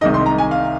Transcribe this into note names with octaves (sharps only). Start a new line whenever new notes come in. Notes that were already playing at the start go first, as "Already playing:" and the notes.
C2 C3 D#3 G#3 D#4 D#5
C6
A#5
G#5
F5